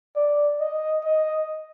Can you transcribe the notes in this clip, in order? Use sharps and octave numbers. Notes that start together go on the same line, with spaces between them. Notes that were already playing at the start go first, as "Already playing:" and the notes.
D5
D#5
D#5